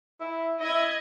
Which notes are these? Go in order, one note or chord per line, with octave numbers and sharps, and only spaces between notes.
E4
E4 D#5 B5 G#6